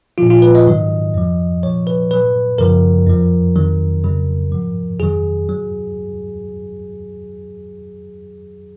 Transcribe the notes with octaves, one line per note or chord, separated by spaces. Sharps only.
A#2 F3 F4
F4
B4
D#5
G#2 D#3 F#3
F2 F3
A#2 F3 C#5
B4
A#2 F#3 B4
F#2 C#3 F3 A#4
F2 F3
F2 D#3 F#3
F2 C#3 F#3
G#2 F3
F2 D#3 F#3 G#4
F#3